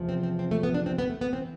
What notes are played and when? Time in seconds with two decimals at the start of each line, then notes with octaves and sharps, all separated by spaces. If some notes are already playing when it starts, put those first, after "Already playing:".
Already playing: E2 C3 F3
0.09 C4
0.23 C4
0.39 C4
0.51 A3
0.63 B3
0.74 D4
0.86 C4
0.98 B3
1.10 A3
1.21 B3
1.33 E3 C4